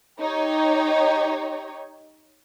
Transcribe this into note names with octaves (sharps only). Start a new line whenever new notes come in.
D#4 G4 C#5